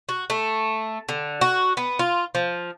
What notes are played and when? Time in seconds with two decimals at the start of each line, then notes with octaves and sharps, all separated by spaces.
0.09 F#4
0.30 A3
1.09 D3
1.41 F#4
1.77 B3
1.99 F4
2.35 F3